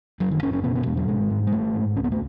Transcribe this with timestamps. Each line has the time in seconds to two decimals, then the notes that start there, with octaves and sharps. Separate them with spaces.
0.20 F#1 F#3
0.31 D#3
0.43 F#1 C#4
0.53 C#4
0.64 B2 B3
0.75 B3
0.86 E2 G#3
0.97 F#3
1.08 G#1 G#3
1.30 G#2
1.47 G#3
1.52 G#1 A3
1.75 G#2
1.96 C#2 C#4
2.04 B3
2.12 A3